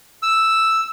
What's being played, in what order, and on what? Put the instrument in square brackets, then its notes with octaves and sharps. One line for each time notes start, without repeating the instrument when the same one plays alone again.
[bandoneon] E6